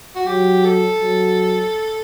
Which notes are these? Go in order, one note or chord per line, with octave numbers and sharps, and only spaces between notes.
F#4
F#3 G4
A4
F#3